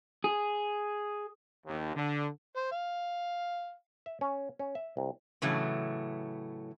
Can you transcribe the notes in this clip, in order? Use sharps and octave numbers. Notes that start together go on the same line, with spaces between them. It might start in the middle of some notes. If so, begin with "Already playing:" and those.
G#4
D#2
D3
C5
F5
E5
C#4
C#4
E5
C2
A2 C#3 E3 F#3 A3